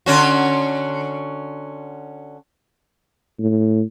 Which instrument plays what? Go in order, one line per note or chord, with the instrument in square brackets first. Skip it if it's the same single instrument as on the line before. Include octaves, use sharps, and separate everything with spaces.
[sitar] D3 C#4 F#4
[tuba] A2